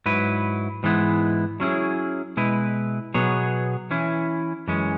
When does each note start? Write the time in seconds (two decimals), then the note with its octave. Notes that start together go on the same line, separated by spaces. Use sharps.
0.06 G#2 F#3 E4 B4
0.83 G#2 E3 G#3 B3 E4
1.60 F#3 C#4 E4 G#4
2.37 B2 G#3 E4 B4
3.14 B2 F#3 B3 G#4 C#5
3.91 E3 C#4 E4
4.68 F#2 E3 G#3 C#4